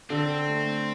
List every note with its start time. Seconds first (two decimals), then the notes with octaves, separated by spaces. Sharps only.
0.10 D3 C4
0.48 A3